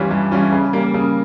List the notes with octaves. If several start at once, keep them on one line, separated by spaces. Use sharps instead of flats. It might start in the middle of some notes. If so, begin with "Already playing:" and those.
Already playing: G2 E3 G3 C#4 F4
G2
E3 G3 C#4 F4
C#3
G3 A#3
C#3